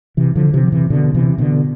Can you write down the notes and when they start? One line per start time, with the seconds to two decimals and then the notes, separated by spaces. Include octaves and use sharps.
0.17 C3 E3
0.35 D3 F3
0.53 C3 E3
0.64 F3
0.72 C3 E3
0.90 B2 D3
1.14 C3 E3
1.38 B2 D3